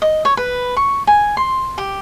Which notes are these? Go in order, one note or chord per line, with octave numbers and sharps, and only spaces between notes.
D#5
C#5
B4
C#6
G#5
C6
G4